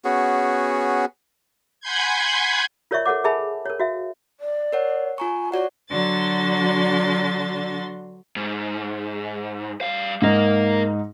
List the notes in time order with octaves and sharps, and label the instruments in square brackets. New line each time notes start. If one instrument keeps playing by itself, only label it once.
[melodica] B3 C#4 F#4 G#4
[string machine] F#5 G#5 B5 C6 G6 G#6
[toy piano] F4 A#4 C#5 D5 E5 C#6
A4 A#4 C#5 F#5 D6
G#4 A#4 E5 G#5 A5 B5
A#4 C#5
F#4 E5 F5
[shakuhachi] D5
[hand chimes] A#4 C#5 F#5
[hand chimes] F4 A#5 C#6 [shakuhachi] G#5
[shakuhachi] F#4 [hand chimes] C#5 D5 F#5
[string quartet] D3 F#3 D4 F#4 C6 A6
[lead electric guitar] G#2
G3 F5
[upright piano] G#2 D#4 [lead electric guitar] A#3 A#4